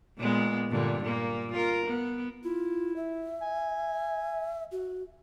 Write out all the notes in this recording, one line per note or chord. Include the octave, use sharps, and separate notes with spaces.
A#2 G#3 B3
G2 A#2 D3
A#2 A#3
F4 A#4
B3
E4 F4
E5
G#5
F#4